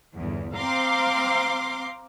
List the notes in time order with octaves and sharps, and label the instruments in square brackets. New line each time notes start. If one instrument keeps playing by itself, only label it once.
[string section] G1 E2
[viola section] C4 F5 [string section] A#5 C6 D6